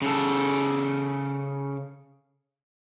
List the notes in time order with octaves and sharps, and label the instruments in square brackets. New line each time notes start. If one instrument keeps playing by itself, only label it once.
[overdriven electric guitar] C#3 A4